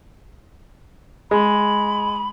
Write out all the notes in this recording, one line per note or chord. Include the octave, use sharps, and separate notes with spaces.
G#3 B5